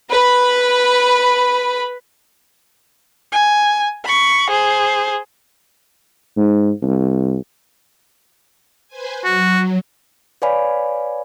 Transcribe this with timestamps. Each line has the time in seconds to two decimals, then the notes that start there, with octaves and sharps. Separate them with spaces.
0.10 B4 B5
3.32 G#5
4.04 B5 C#6
4.50 G#4 C5
6.37 G#2
6.82 C2
8.88 B4 C5 G#5
9.24 F#3 F#4
10.42 B4 C#5 D5 F5 G#5 B5